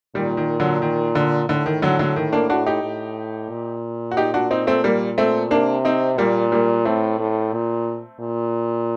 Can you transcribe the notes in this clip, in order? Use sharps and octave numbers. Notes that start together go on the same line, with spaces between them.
A#2 D#3 G3
D#3
D3 F#3
D#3
D3
A2 D3
D#3
D3 F#3
D3 F#3
D#3
A#3 D4
D4 F#4
D#4 G4
A2
A#2
F#4
D#4 G4
D4 F#4
C4 D#4
A3 C4
G3 A#3
A3 C4
C3 A#3 D4
C4 D#4
A#2 G3 A#3
G3 A#3
A2 A3 C4
A2
A#2
A#2